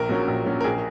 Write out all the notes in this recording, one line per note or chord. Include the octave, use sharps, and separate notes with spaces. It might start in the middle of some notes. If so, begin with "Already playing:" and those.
Already playing: A#1 A#4
A#2 F#3 C#4
A#1
A#2 F#3 C#4
A#4
A#1 G#4